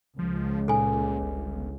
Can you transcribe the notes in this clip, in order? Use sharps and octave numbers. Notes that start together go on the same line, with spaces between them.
C#2 F3
A#2 A4 G#5
G1